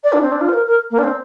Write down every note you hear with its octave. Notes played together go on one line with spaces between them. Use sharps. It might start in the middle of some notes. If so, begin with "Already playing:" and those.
D5
D4
C4
D4
F4
C5
A#4
A#4
A#3
D4
C4